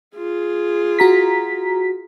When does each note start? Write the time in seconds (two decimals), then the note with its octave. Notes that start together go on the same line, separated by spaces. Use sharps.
0.16 F4 G#4
0.99 F#4 A#5 B6